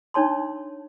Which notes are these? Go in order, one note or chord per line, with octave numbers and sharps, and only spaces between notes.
D4 D#4 C#5 A5 C6